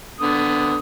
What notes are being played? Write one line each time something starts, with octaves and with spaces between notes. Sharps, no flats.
D3 B3 D#6